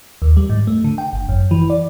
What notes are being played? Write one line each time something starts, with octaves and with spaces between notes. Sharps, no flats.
D#2
G3
G#2
A3
D3
G5
G1
F#2
E3
D5